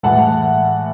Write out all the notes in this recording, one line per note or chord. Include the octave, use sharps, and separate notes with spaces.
A2 E3 G#3 F#5 A5